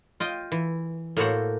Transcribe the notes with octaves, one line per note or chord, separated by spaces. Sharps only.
F4 D#5 G5
E3
A2 A#3 F#4 A4 C5 F#5